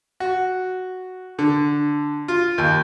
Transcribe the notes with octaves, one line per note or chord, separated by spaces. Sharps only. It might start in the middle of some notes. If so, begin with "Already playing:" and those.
F#4
D3
F4
D#2